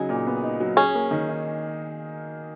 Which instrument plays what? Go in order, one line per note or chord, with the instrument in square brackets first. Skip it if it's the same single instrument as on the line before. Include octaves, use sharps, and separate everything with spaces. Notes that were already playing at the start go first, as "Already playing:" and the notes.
Already playing: [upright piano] C#3 F#3 D#4 [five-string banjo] G#4
[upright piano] A#2
B3
D#4
F#3
[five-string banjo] C#4 [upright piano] G#4
[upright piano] A#3
D#3
D#4